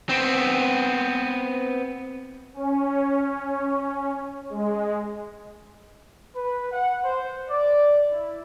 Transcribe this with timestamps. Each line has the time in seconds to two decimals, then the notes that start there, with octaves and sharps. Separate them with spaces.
0.09 B3 C4
2.54 C#4
4.50 G#3
6.35 B4
6.72 F#5
7.04 C5
7.50 D5
8.11 E4